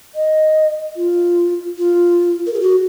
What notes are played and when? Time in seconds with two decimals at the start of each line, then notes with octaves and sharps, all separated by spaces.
0.15 D#5
0.96 F4
1.78 F4
2.47 A#4
2.53 G#4
2.61 F#4